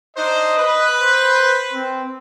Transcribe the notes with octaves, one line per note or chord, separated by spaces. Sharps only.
D4 D#4 C5 D#5
B4
C5
C4